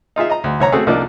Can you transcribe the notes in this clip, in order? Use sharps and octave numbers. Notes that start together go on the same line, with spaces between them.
D#4 F4 G#4 E5
D#5 A#5
D2
C2 C#5 A#5
A3 C4 F#4 G#4
C2 F3 A#3 D4 D#4